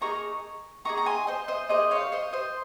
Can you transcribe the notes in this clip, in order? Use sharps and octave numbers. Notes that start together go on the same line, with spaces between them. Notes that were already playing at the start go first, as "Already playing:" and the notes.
A#3 D#4 G#4 A#5 C#6
A#3 D#4 G#4 A#5 C#6
A#5
G#5 C6
C5 D#5
C5 D#5
A#3 D#4 G#4 C5 D#5
C#5 F5
C5 D#5
C5 D#5